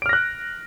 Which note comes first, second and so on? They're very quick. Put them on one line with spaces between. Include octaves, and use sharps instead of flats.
D7 F6 A#6 F#6